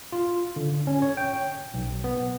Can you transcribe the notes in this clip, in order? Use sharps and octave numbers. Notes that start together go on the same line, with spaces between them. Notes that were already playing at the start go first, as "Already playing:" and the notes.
F4
D3
C#4
C#5
G5
B1
B3